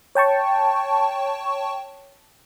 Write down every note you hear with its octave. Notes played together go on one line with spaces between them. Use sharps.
C#5 G5 A5 C#6